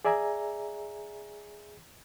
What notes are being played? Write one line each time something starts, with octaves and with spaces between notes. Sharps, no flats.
G#4 D5 E5 G#5 A#5